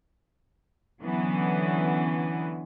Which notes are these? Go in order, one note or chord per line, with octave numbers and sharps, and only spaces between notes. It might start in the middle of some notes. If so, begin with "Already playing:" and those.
D3 E3 F#3 B3 C#4